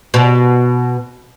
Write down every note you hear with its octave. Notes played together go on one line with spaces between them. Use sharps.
B2